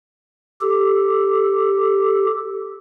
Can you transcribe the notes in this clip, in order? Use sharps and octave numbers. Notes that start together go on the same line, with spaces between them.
G4 A4